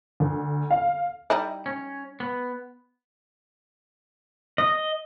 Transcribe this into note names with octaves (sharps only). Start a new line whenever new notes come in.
D2
F5
G3 D#4 E4
C#4
B3
D#5